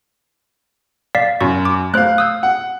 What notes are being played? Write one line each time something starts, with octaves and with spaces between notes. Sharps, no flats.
D5 F5 B6
F#2 C#6
D6
A3 C5 F5 F#6
D#6 E6 G6
F#5